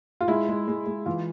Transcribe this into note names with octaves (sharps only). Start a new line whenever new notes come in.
F4
G#3 E4
G#3
G#3
G#3
E3 F4